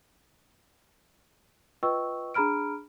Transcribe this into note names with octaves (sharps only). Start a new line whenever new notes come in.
F4 B4 D#5 G5 C#6 E6
D4 G#4 A#5 B5 F6 D7